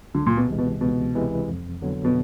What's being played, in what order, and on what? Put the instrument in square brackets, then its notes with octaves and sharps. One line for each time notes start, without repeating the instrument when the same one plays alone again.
[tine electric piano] C#2 [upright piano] D3
[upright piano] A#2
B2
[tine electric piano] C3 E3 G#3
[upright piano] B2
[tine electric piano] C#2 [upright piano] B2
[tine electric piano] C3 E3 G#3
F2
D3 F#3 B3
[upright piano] B2